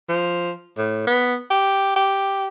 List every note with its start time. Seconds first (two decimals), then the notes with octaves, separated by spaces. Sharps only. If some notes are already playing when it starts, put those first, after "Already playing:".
0.09 F3
0.78 A2
1.07 B3
1.50 G4
1.96 G4